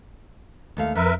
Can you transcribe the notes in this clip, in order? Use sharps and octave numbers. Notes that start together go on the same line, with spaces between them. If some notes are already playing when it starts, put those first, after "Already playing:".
D#2 A3 F5
F2 A#4 B4 E5